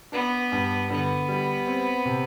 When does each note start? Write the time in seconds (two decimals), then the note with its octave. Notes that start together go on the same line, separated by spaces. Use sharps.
0.12 B3 D4
0.52 G2
0.90 D3 B3
1.28 G3
1.67 C4
2.05 C3